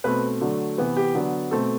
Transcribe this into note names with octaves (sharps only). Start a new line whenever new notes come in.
B2 A3 C4 B4
D3 F#3 A3
C3 E3 B3 B4
G4
D3 F#3 B3
B2 A3 C4 A4